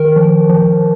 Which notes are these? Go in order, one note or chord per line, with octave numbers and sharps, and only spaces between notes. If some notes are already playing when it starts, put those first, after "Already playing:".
Already playing: D#3 A#4
F3
F3